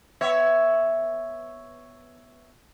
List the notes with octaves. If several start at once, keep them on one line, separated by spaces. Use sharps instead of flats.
B3 C#5 E5